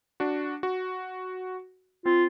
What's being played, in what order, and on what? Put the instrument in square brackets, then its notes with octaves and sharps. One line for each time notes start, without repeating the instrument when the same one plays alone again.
[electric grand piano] D4 F#4
F#4
[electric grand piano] C4 [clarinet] F4